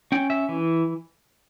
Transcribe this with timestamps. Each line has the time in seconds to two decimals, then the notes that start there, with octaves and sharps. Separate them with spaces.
0.12 C#4 G5
0.30 E5
0.49 E3